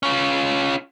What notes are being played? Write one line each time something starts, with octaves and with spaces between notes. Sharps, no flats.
C#4 F4